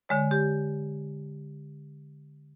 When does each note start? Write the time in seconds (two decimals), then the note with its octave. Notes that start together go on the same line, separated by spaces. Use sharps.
0.09 D3 G#3 C#5
0.31 G4